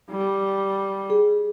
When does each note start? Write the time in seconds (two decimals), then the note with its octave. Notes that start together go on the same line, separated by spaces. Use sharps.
0.10 G3
1.10 G#4